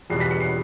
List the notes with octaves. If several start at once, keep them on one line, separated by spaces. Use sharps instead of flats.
E2 B2 G3 C7
B6
C#7
C7